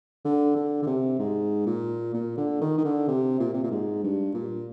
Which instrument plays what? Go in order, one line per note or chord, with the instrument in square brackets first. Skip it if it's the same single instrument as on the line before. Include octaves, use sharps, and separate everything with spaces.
[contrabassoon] D3
D3
D3
C3
G#2
A#2
A#2
D3
D#3
D#3
D3
C3
A#2
C3
A#2
G#2
G2
A#2